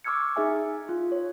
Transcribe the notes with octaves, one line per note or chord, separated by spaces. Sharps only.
C#6 D6 E6 F6 G#6 C#7
D#4 G#4 E5 G#5
F4
C#5